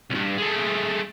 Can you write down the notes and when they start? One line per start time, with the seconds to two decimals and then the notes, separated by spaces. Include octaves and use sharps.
0.10 C2 G2
0.38 G#3 A3